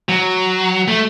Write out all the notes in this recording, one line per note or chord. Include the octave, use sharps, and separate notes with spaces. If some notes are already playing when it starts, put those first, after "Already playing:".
F#3
A3